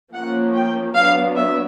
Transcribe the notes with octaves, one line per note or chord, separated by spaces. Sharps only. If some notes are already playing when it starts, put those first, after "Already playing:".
F3 A#3 C#4 F#5
G5
F#3 B3 D4 F5
E5